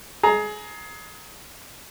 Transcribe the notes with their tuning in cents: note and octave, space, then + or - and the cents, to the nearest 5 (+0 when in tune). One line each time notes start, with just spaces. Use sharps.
G#4 +25 A#5 +0